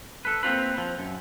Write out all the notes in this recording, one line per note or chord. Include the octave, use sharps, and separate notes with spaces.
A4 B4
A#3 C4 F4 B4
F3
F#2